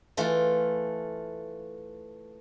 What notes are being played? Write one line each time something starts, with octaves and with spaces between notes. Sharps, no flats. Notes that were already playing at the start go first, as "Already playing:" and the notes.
E3 A3 F4